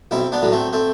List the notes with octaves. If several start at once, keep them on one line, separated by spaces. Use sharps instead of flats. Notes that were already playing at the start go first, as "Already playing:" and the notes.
B1 C4 E4
B3 D4
A2 F#3
A3 C4
A3 C4